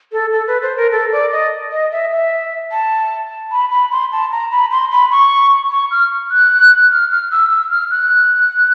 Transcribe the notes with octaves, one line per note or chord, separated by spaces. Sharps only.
A4
A4
B4
C5
A#4
A4
D5
D#5
D#5
E5
E5
A5
B5
B5
C6
A5
A#5
B5
C6
B5
C#6
C#6
F6
F#6
F6
F6
E6
E6
F6
F#6